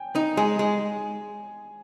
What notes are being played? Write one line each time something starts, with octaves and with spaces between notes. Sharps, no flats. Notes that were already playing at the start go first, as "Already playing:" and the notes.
Already playing: G5 G#5
D#4
G#3 G#5
G#3